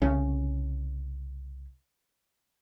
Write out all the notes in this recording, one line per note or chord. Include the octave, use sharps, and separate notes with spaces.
C2 C#3 C#4